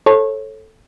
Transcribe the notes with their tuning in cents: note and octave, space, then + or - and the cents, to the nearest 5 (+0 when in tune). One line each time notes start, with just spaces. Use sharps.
A4 +0 C#5 -30